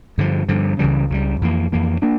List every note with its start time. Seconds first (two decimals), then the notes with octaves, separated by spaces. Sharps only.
0.18 G2 D3 F3
0.49 G2 D3 F3
0.79 C#2 C#3 E3 G3
1.10 C#2 C#3 E3 G3
1.41 F2 E3 A#3
1.72 F2 E3 A#3
2.02 A#3 D4